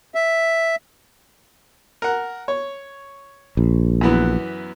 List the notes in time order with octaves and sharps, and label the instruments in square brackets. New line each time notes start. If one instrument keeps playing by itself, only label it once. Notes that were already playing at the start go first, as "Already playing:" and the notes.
[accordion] E5
[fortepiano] A#4 F#5
C#5
[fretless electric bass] A#1
[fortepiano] F#2 E3 B3